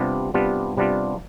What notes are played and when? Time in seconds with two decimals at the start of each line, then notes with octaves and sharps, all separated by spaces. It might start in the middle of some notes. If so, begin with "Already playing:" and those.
Already playing: C3 G3 B3 D4 F4
0.34 C3 G3 B3 D4 F4
0.77 C3 G3 B3 D4 F4